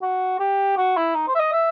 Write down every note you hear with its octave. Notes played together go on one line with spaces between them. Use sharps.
F#4
G4
F#4
E4
D#4
C5
E5
D#5
E5